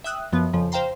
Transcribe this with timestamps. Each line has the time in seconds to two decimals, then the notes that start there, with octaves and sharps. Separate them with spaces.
0.04 E5 G5 D#6 E6 F#6
0.32 F#2 F3 B3
0.53 F2 C#3 F3
0.72 C5 F5 G5 A#5 C6